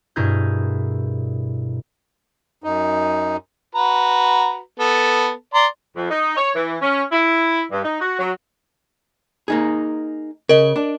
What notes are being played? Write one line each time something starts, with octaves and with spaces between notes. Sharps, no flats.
G2 B2 E4 G#4 A#4 G6
F#2 D#4
F#4 B4 A#5
B3 A4
D5 A#5 C6
F2
D#4
C#5
E3
C#4
E4
G2
D#4
F#4
F#3
A#3 D#4 G#4
C#3 A#4 D#5
D4